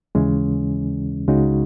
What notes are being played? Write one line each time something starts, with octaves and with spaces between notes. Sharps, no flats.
D#2 C#3 E3 G#3 C#4
C#2 C#3 G#3 D#4 F#4